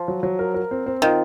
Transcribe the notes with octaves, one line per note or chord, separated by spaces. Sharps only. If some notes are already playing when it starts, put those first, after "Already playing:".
Already playing: F3
F#3
F#3
A#4
A#4
C4
C4
D#3 F4